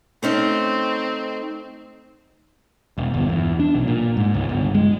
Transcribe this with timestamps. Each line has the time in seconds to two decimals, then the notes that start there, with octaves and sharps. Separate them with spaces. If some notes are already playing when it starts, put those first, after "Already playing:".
0.23 A3 C4 C#4 D#4
2.98 E1
3.14 G1
3.29 E2
3.60 D4
3.75 B1
3.87 A#2
4.17 G#2
4.34 C#2
4.49 G1
4.75 G#3